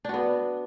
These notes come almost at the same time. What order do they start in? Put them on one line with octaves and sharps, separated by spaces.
D4 F#4 B3